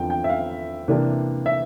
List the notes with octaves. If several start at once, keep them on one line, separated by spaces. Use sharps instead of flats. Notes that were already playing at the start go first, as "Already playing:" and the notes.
Already playing: E2 D3 F3 C4 G5
G5
E5
F5
C3 E3 A#3 D4
E5